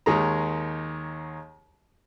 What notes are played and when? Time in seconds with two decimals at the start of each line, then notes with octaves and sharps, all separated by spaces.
0.06 D#2 D#3 G#3 D#4 A#5